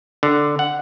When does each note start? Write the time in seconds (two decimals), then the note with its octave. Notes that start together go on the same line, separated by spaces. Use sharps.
0.23 D3
0.59 F#5